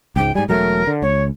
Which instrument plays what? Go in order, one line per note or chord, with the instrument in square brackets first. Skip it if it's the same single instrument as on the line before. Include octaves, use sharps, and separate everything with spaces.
[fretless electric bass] C#2 G#2 [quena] G5
[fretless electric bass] G#2 G3 [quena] G#5
[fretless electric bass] E1 F#3 A3 [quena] A#4
[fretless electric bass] D3
[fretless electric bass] C#2 [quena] C#5